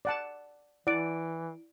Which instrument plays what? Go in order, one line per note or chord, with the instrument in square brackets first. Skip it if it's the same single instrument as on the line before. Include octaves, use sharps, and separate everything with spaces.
[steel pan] D5 F#5 A5
[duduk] E3 [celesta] E4 D7 [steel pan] D5 F#5